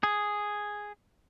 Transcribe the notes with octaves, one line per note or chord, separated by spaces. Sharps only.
G#4